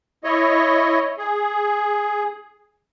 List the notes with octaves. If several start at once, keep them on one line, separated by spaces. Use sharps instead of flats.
E4 C#5 D#5
G#4